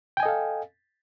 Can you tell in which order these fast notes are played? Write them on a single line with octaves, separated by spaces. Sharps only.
G5 G#5 D#5 A4 F5